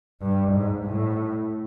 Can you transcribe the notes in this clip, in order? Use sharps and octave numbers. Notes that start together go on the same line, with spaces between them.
G2
G#2
A2